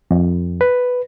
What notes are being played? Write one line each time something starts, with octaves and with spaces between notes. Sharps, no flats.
F2
B4